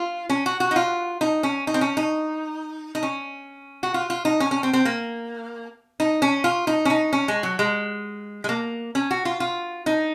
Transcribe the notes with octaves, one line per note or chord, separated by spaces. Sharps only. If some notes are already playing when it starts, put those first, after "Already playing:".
Already playing: F4
C#4
F#4
F#4
D#4
F4
D#4
C#4
D#4
C4
C#4
D#4
D#4
C#4
F#4
F4
F4
D#4
C#4
C#4
C4
C4
A#3
D#4
C#4
F4
D#4
C#4
D#4
C#4
G#3
F#3
G#3
G#3
A#3
C#4
F#4
F4
F4
D#4